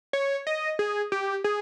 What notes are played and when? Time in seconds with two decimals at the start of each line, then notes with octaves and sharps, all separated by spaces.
0.13 C#5
0.47 D#5
0.79 G#4
1.12 G4
1.44 G#4